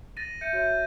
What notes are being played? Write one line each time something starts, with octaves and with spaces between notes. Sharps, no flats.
A6 A#6 D#7
E5 G6 C#7 D#7
F#4 C#5 E5 G6